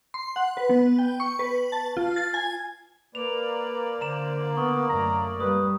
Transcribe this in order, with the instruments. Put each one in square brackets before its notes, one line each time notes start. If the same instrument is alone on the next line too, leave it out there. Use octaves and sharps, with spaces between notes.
[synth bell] C6
F#5
B4
B3
G5
C#6
B4
A5
F4
A6
G#5
[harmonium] A#3 D5 [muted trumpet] B4 [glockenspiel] F7
[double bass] D3 [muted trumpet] C5 [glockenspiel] A#5 E7
[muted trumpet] B3 [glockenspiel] C#6 D#6
[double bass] F#2 A3 [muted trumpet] A#5
[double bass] G3 [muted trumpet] B4 [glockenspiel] D#6